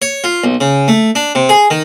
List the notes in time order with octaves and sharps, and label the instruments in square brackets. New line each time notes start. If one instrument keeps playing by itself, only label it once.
[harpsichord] C#5
F4
B1
C#3
A3
D4
C3
G#4
D#3